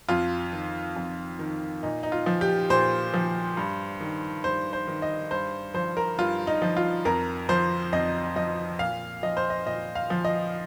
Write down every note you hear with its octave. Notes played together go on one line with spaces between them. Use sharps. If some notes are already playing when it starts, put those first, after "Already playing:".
F2 F4
D#3
F2
D#3
A#2 D#4
D#4
F4
F3
G4
A#2 C5
F3
G2
D#3
G2 C5
C5
D#3
D#5
G2 C5
F3 C5
A#4
G2 F4
D#4
F3
F4
F2 A#4
F3 C5
F2 D#5
F3 D#5
A#2 F5
F3 D#5
C5
D#5
A#2 D#5
F5
F3
D#5